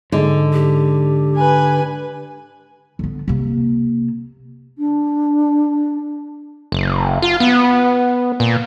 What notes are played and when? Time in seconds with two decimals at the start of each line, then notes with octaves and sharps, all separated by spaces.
0.12 G#2 D3 G#3
0.53 G4
1.36 B4 G#5
2.99 D3 B3
3.28 C3 A#3
4.78 D4
6.72 F#1
7.22 F4
7.40 B3
8.40 A#2